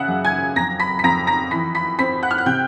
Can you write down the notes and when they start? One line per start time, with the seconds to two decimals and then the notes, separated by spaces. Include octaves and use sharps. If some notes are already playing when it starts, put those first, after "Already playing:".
Already playing: C#3 E5 F#5 E6 F#6
0.08 F#2
0.25 G#5 G#6
0.56 F2 A#5 A#6
0.80 B5 B6
0.99 B6
1.04 F2 A#5 A#6
1.27 A#5 A#6
1.51 E3 B5 B6
1.75 B5 B6
1.98 C4 B5 B6
2.22 F#5 F#6
2.31 F6
2.38 F#6
2.46 C3 G5 G6